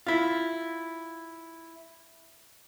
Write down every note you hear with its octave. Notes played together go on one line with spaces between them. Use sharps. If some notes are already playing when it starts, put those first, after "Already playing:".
E4 F4